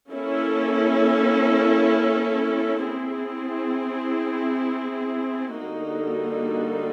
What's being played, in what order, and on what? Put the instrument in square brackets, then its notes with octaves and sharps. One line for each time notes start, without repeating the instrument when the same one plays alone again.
[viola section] A#3 C#4 E4 A4
C4 E4 G#4
D3 G3 A#3 D#4 F#4